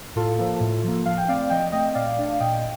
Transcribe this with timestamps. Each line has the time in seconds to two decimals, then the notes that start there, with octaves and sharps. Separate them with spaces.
0.15 A2 F4 A4
0.38 F3 A#3
0.60 A2
0.84 F3 A#3
1.06 F3 F5
1.17 G5
1.28 A3 C4 D5 F5
1.50 F3 D#5 G5
1.72 A3 C4 D#5 G5
1.95 A#2 D5 F5
2.17 A3 D4
2.40 A#2 D#5 G5